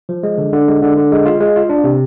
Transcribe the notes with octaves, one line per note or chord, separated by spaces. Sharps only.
F3
G#3
D3
D3
G#3
D3
D3
G#3
F4
G#3
F4
D4
C3